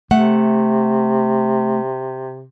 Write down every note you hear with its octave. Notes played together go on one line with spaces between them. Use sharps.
C3 A3 F#5